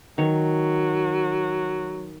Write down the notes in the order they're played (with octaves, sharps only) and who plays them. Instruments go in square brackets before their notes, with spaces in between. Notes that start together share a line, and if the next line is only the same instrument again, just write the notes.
[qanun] D#3 C#5 [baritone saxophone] F#3